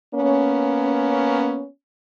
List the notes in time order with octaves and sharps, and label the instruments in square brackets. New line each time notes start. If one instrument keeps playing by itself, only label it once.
[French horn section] A#3 B3 C#4